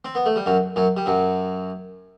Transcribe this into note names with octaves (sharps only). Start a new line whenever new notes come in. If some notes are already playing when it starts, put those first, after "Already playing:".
C4
B3
A3
G3
F#2 F#3
F#2 F#3
G3
F#2 F#3